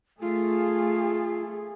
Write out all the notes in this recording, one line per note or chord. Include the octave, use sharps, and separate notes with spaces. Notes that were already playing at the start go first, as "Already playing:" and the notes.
A3 F4 G#4